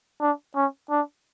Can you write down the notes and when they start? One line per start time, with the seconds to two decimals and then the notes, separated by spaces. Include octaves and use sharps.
0.21 D4
0.56 C#4
0.90 D4